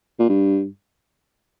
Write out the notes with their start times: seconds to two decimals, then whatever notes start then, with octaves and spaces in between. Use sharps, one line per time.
0.20 A#2
0.29 G2